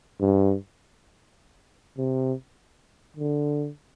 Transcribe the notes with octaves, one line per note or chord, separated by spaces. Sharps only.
G2
C3
D3